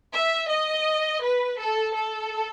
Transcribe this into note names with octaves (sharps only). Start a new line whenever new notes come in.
E5
D#5
B4
A4
A4